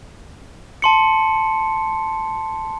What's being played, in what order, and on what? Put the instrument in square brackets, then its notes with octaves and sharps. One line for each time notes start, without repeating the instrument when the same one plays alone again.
[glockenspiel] A5 C6 C#7